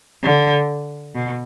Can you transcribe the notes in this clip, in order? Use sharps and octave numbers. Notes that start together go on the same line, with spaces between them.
D3
B2